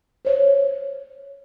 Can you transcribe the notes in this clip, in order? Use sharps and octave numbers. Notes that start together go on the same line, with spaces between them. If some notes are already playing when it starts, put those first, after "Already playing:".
C5 C#5